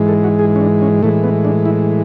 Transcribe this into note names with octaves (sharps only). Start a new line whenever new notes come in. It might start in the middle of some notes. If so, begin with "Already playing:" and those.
Already playing: G#2 E3 G#3
A4
F#4
G#4
C#4
D4
C#4
A2 E3 G#3 A3
B3
D4
E4